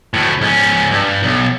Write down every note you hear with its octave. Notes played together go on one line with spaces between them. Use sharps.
D2 A2
G#2 C#4
G2
B1